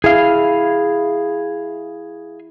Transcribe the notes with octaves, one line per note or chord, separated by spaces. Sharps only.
E4 G#4 F5